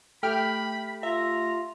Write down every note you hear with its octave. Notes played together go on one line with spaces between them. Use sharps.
A3 G4 G5 B5 F6
F4 E5 A#5